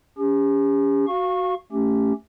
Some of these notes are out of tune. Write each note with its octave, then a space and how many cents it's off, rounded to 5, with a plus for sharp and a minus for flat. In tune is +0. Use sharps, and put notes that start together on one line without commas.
C#4 +30 G4 +40
F#4 +0 F5 +0 C#6 -20
A3 +0 C#4 +0 G4 +0